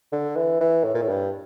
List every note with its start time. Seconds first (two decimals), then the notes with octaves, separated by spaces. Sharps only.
0.12 D3
0.36 E3
0.61 E3
0.84 A2
0.94 A#2
1.02 A2
1.09 G2